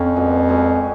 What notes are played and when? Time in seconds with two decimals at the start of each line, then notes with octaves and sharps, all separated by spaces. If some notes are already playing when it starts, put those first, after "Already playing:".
Already playing: F2 C#4
0.16 A#2 G#3 B3 F#4
0.49 A#2 G#3 B3 F#4